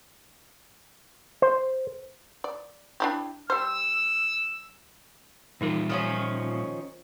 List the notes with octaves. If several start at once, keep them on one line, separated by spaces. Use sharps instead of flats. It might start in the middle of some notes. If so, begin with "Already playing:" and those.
C5
D5
D4 E4 G4
G3 C5 E6
A#2 E3 G3 D#4 F4 A#4
D#3 F3 C#4